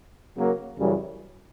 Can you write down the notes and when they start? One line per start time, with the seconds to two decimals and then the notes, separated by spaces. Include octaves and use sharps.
0.35 C#3 F#3 A#3
0.78 F#2 C#3 E3 G3